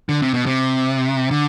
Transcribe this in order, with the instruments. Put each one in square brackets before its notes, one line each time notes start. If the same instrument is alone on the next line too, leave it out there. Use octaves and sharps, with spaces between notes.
[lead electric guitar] D3
C3
B2
C3
D3